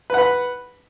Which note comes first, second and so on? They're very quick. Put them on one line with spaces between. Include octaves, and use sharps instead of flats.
B4 F#5 B5